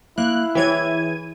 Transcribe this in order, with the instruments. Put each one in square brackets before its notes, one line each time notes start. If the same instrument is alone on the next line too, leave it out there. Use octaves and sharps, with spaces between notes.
[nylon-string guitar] A#3 [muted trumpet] E4 [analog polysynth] F#6
[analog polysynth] E3 G#6 D#7 [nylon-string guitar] G#4 C#5 G5